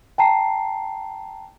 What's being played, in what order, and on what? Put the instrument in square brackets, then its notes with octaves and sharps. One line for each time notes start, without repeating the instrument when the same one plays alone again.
[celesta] G5 A5 A#5 C7